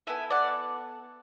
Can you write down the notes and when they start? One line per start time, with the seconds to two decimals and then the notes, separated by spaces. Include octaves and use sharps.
0.07 B3 E4 A4 E5 G#5
0.30 D5 F#5